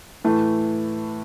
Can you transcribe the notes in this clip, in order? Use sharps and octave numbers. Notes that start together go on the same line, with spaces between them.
A2 E3 A3